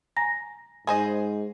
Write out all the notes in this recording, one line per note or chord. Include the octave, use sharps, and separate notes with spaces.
G#5 A#5 A#6
G#2 G#4 C5 D#5